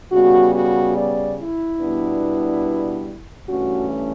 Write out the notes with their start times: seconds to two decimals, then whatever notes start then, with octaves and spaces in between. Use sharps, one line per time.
0.12 C#3 G3 B3 F#4
0.53 F#4
0.95 D5
1.38 E4
1.80 B2 G3 B3 D4
3.48 G2 E3 A3 C#4 F#4